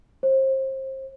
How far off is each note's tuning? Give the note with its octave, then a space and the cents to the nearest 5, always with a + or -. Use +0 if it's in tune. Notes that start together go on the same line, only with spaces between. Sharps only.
C5 +30